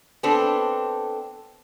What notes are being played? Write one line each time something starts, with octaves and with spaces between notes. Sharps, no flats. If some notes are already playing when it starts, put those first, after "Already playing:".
B3 C4 D4 A4